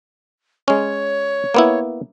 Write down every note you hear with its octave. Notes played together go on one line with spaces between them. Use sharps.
G#3 C#4 C#5
A#3 B3 E4